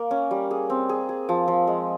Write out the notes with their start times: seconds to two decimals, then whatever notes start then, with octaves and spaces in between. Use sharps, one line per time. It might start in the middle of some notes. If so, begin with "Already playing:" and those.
Already playing: A#3
0.11 C#4
0.31 G3
0.51 G#4
0.70 C4
0.89 G#4
1.09 G#4
1.29 F3
1.48 F3
1.67 G#3